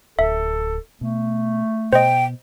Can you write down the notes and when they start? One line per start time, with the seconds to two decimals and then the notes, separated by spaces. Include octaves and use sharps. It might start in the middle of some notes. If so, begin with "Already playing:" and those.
0.19 D1 A4 E5
1.01 B2 A3
1.93 B2 C5 D#5 G5